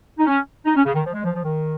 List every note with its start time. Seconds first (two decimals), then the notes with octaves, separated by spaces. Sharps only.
0.18 D#4
0.26 C#4
0.65 D#4
0.75 C#4
0.85 C#3
0.94 D#3
1.05 F3
1.14 G#3
1.24 F3
1.34 F3
1.43 D#3